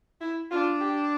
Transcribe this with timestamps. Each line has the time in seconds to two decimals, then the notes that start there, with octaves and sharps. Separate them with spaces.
0.21 E4
0.51 D4 F4
0.81 G4